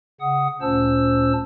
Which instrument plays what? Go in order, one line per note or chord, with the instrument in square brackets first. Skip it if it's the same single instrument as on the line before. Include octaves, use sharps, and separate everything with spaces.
[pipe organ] C#3 F#5 D#6
D2 A#2 C#4 C5 A5 E6